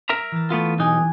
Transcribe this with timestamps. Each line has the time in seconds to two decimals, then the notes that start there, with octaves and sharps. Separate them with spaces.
0.09 A#4 E5 A#5
0.32 E3 A6
0.50 A3 B3 F4
0.79 B1 D#4 G4 G#5 F#6